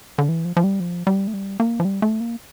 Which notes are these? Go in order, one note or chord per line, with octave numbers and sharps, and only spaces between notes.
D3
E3
F3
F3
G3
F3
G3
A3
G3
A#3
F3
G3
A3
A#3